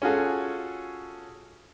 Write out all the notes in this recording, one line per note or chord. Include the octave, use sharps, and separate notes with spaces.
C#4 F4 F#4 G#4 A4